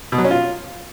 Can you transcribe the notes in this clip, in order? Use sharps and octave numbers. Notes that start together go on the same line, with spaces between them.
B2
F#3
C#4
F4